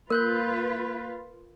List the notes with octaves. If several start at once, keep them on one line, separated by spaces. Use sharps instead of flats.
A#3 F4 A#4 B4 F#6 G6